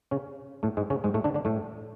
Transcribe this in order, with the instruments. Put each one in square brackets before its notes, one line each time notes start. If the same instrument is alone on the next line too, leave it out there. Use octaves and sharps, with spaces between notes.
[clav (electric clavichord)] C#3 C#4
A2 A3
G#2 G#3
C#3 C#4
G#2 G#3
A2 A3
D3 D4
D3 D4
A2 A3